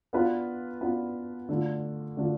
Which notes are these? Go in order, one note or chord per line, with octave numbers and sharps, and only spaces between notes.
B3 D4 F4 B4
B3 D4 F4 B4
D3 A3 D4 F4
D3 A3 D4 F4